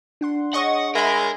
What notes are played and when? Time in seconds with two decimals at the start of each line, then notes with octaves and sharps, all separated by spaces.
0.21 D4 F#5 C6
0.54 G#4 C#5 D#5 F#5 C#6 D#6
0.95 G#3 A#4 E5 B5